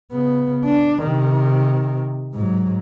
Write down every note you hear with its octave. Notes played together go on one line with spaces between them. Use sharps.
C#3 B3
D4
C3 D#3
G#2 F#3